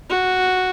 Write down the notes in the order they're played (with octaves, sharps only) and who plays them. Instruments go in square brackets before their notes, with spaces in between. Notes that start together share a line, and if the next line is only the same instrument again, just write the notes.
[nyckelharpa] F#4